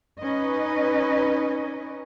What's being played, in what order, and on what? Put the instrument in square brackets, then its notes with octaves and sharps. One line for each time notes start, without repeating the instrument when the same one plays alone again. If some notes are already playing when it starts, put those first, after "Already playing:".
[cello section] C#4 D#4 B4 D#5